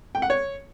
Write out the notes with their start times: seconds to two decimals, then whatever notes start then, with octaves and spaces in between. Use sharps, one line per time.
0.15 G5
0.22 F#5
0.30 C#5